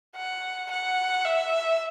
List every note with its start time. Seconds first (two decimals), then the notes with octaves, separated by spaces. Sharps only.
0.16 F#5
0.71 F#5
1.25 E5